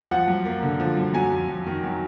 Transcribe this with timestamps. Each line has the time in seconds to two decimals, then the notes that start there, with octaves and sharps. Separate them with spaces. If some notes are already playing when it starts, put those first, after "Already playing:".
0.11 F3 F#5
0.28 F#2
0.45 A#3
0.63 D3
0.80 F3
0.97 F#2
1.14 F#3 G#5
1.32 F2
1.48 F2
1.67 D#3
1.84 F#3